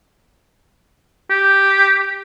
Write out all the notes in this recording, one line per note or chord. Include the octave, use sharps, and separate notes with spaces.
G4